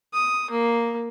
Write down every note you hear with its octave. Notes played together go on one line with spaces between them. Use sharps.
D#6
A#3